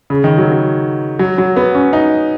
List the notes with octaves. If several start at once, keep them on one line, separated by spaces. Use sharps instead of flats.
C#3
D#3
F#3
F#3
F#3
F#3
B3
C#4
D#4